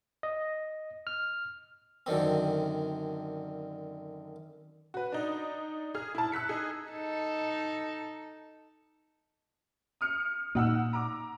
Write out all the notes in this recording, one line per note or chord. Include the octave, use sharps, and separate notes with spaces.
D#5
F6
F#2 D3 D#3 C4
F#4 B4
D4 D#4
G#4 F6
E4 A5
E6 F#6 B6 C#7
D#4 G#4
D#4 A4
D#6 F6 C#7
A#2 A#3 D#4 F#5 E6
A#5 D6